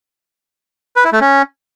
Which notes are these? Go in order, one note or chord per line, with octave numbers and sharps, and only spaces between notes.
B4
E4
A3
C#4